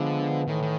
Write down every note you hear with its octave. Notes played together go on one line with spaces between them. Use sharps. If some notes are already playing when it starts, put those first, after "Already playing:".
Already playing: D3 F3 G#3 B3
A2 D#3 E3
D#3